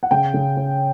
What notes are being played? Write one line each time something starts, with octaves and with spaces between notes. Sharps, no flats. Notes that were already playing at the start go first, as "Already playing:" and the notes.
F#5
C#3 G5
C#3
C#4